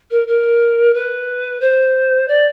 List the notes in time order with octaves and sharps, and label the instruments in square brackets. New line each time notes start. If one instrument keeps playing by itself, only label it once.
[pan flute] A#4
A#4
B4
C5
D5